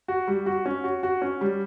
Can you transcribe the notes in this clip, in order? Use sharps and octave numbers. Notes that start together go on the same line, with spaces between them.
F#4
G3
F#4
C#4
F#4
F#4
C#4
G3